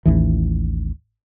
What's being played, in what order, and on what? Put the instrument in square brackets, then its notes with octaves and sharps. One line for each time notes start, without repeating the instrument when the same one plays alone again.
[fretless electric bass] A1 D#2 E3